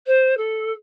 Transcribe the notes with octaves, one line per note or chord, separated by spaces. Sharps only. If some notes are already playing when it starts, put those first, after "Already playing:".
C5
A4